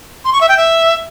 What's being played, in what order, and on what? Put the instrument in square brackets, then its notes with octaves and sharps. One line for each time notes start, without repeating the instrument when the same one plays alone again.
[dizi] C6
C#6
E5
G5
E5